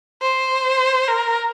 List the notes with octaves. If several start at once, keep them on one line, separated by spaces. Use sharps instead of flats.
C5
A#4